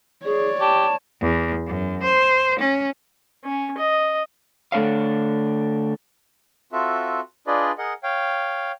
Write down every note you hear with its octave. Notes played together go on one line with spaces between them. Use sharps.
G#4 C#5 D5
G4 A5
E2
F#2
C5
C#4
C#4
D#5
D3 A3 D4 C#5 F5
C4 F4 F#4 A4 E5
D4 F4 G#4 B4 D5 D#5
G#4 A#4 D#5 F#5
C#5 F5 G5